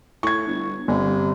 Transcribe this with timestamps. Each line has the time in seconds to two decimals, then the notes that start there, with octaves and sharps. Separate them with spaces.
0.23 A2 C#6 G#6
0.47 G1
0.88 G1 C3